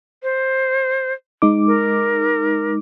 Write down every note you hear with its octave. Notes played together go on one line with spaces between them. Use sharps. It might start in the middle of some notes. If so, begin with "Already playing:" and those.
C5
G#3 D#4 D6
A#4